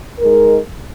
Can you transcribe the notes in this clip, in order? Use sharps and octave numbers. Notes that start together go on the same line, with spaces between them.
G#3 D#4 A#4